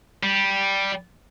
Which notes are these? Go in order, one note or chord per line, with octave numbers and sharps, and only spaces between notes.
G3